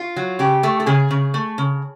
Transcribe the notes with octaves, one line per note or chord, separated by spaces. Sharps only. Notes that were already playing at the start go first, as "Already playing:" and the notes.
Already playing: F4
F#3
C#3 G4
A3
A4
C#3 G#4
C#3
A3
C#3